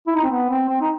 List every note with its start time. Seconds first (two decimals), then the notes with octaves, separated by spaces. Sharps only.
0.07 E4
0.15 D#4
0.23 C4
0.30 B3
0.49 C4
0.69 C4
0.81 D#4